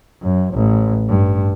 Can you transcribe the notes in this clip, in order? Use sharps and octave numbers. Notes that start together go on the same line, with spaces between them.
F#2
A1
G2